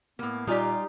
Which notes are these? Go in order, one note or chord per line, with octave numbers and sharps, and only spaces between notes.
A2 A#3 B3
A#2 G3 D#4 F4 G4 D5 F5 G#5